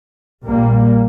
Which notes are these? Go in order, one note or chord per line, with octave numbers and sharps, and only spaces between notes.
A#1 A#2 G3 A#3